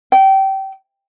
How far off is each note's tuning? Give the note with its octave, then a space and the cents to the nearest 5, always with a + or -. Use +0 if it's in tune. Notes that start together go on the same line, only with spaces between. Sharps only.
G5 -25